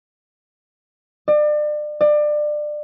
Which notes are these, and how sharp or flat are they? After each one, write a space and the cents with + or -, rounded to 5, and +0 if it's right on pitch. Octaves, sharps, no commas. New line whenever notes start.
D5 +35
D5 +25